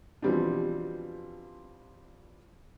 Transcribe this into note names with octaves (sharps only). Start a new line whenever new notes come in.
B2 E3 F3 G3 C4 D4